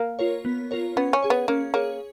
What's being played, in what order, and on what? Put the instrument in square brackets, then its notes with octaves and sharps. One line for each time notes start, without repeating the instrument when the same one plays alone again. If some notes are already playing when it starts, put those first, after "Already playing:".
Already playing: [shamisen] A#3
[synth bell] F4 A#4 C#5
B3
F4 A#4 C#5
[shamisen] B3 [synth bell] C#4
[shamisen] C#4
[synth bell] G#4 C#5
[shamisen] B3
[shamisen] A#3 [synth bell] C#4
[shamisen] A#3 [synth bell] G#4 C#5